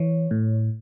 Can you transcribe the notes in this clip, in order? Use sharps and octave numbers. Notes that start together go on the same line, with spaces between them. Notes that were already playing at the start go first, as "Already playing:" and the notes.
Already playing: E3 C#5
A2